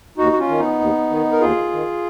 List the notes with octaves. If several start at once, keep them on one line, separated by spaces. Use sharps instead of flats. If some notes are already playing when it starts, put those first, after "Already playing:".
D#2 D#4 F#4
F#4
C#4 F4
D#3
B3 D#4
D#2
D#3
A#4
D#2 F4 G#4
D#3